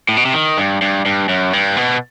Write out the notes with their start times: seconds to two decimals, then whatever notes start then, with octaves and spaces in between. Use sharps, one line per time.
0.09 A2
0.17 B2
0.25 C3
0.33 D#3
0.58 G2
0.82 G2
1.06 G2
1.29 F#2
1.53 G2
1.77 B2